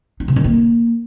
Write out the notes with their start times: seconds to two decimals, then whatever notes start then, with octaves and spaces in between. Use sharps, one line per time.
0.20 D#4
0.28 C3
0.36 D#3
0.44 A#3